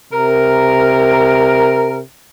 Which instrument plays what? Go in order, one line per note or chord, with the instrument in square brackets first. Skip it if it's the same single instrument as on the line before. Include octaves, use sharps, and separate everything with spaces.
[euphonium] C3 [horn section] A#4